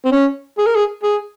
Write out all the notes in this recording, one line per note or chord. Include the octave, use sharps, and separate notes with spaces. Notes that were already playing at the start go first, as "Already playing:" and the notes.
C4
C#4
G#4
A#4
G#4
G#4